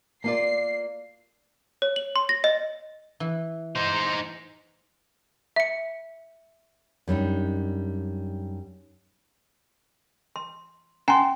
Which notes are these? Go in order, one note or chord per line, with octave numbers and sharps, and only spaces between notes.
A#3 F4 D5 C7
C#5
F#7
C6
A#6
D#5
E3
D#4 C5
E5 C#7
F#2 G3 D4 D#4
C6
C#4 F#5 G#5 A#5 C6